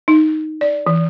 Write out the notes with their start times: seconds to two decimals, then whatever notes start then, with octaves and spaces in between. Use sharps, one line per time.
0.08 D#4
0.61 D5
0.87 E3